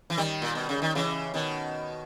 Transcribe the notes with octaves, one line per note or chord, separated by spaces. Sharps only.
E3
D#3 G3
A#2
B2
C#3
D#3
C#3 E3
B2 D#3